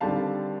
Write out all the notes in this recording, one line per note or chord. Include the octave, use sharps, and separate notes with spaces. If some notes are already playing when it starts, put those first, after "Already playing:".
D#2 D3 G3 C4 F5 A5